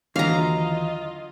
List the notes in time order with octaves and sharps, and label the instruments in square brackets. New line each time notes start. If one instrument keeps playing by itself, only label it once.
[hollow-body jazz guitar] D#2 E3 [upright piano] D3 F#3 [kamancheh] F4 D#5 [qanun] F5 A#5